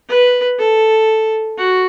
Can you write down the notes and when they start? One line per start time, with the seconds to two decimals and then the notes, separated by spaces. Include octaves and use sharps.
0.09 B4
0.59 A4
1.58 F#4